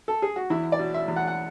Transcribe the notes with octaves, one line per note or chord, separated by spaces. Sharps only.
A4
G#4
F#4
E2 E4
D5
B2
E5
E2
F#5
F#5